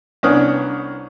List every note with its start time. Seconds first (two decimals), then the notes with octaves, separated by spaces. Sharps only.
0.23 C2 B3 C#4 D4 D#6 F6